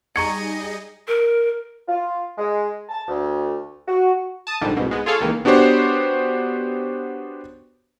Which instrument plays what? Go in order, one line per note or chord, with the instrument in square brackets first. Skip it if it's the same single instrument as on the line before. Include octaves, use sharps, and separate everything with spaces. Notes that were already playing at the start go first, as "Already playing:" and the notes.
[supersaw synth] G3 D#4 G#4 [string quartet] D#5 [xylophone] A#5 C#6 G#6 [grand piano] C#7
[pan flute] A#4
[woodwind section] F4
G#3
A5
D2
F#4
[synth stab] A5 D#6
A#1 G#2 D3 G3
C2 G#2 B2
G#3 B3
F4 G#4 A4 C#5 F5
C#2 D#3 E3 A#3
[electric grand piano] B3 D4 F#4 G4 C5 C#5